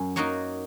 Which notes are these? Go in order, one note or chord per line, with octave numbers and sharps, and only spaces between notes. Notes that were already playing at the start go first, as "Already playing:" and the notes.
Already playing: F#2
F#3 A#3 D#4 F#4